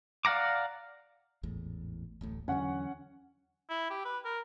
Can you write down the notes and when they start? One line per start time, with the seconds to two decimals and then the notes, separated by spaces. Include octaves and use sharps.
0.25 D5 F5 F#5 A#5 D6
1.43 G#1 E2 A2
2.21 D1 A1 A2
2.48 E2 D3 F#3 C#4 F#5
3.70 E4
3.90 G4
4.05 B4
4.25 A#4